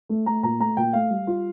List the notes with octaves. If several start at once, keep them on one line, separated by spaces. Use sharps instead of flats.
A3
A3 A#5
A#2 A#5
A3 A#5
A#2 G5
A3 F5
G3
F4